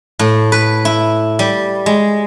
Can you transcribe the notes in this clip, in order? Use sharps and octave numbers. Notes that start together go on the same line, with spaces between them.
A2
B4
E4
G3
G#3